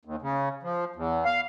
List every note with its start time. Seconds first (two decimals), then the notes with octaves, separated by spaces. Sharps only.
0.05 D#2
0.22 C#3
0.63 F3
0.96 E2
1.25 F5